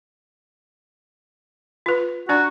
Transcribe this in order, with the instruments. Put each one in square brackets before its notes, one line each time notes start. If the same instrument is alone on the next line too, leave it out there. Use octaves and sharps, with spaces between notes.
[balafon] F4 B4
[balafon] D4 D5 A#5 [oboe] F#4